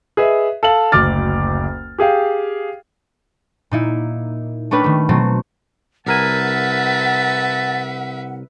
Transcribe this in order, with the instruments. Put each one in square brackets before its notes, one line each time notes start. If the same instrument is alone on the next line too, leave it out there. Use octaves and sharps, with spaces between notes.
[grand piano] G#4 B4 D#5 E5
A4 F5 F#7
F#1 D2 D6 F6 A6
G4 G#4 F5 G5
[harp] A#2 D#4 E4
A3 C#4 D4 G4 B4
D#3 A3
B2 F#3 A3 C4
[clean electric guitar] C2 A#4 G#5 [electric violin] B4 E5 [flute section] F#5 [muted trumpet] A5